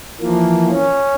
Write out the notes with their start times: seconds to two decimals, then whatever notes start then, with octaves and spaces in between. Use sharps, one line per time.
0.21 E3 F3 A#3
0.72 C#4